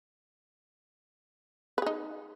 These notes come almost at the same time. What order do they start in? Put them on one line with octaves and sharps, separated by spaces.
B4 G#4 D#4